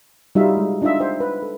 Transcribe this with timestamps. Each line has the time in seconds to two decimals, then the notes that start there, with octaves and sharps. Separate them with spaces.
0.35 G3 D#4 F4 F#4 E5 F5
0.57 G#3
0.82 D4 D#4 F4 D#5 E5
1.00 C5 G5
1.20 B4
1.42 A4